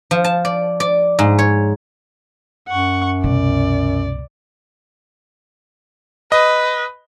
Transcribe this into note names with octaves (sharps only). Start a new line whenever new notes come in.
F3
A5
D5
D5
G#2
C#5
F#2 F#5 C#6
C2 B2 D5
B4 D#5